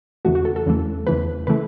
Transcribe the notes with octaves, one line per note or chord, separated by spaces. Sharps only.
E2 C#3 E3 A3 F#4
F#4
A4
A4
E2 C#3 E3 A3
E2 C#3 E3 A3 B4
C#3 E3 A3 B4